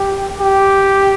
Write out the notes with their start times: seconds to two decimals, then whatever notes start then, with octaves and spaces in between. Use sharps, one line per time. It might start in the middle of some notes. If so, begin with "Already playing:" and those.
Already playing: G4
0.40 G4